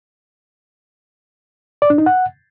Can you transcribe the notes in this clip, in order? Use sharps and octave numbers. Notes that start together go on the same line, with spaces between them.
D5
D4
D#4
F#5